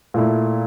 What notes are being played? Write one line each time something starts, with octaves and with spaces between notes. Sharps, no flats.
A#2 A3 E4